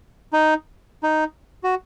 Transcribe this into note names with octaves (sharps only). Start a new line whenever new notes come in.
D#4
D#4
F#4